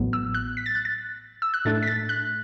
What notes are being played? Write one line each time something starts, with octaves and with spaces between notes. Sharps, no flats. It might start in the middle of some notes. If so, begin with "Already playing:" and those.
Already playing: A1 A2 F#3 B3
E6
F#6
B6
A6
F#6
A6
E6
F#6
A2 A3 D4 A6
B6
A6
F#6